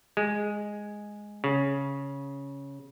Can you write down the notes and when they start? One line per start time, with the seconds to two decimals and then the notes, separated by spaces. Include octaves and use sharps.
0.17 G#3
1.44 C#3